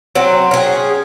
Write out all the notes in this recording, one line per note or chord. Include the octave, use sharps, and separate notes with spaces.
F#3 C4
C#4 G#4